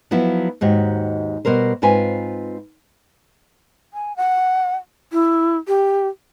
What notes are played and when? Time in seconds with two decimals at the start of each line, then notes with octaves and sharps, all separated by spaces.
0.11 F3 F#3 B3 E4
0.61 D#2 G#2 F#4 G4
1.45 B2 G3 A#4 C5
1.82 G#2 C4 F4 B4 G#5
3.94 G#5
4.16 F#5
5.13 E4
5.68 G4